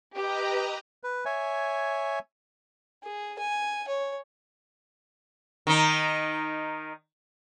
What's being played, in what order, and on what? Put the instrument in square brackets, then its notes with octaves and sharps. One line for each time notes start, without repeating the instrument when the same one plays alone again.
[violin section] G4 [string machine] B4 D#5 A#5
[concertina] B4
C#5 E5 G#5
[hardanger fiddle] G#4
G#5
C#5
[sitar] D#3 D#4